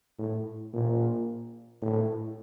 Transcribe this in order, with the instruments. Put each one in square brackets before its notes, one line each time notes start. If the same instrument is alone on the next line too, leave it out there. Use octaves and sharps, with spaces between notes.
[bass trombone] A2
A#2
A2